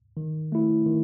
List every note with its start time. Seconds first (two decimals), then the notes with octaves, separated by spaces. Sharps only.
0.17 D#3
0.52 A3 E4
0.86 D#3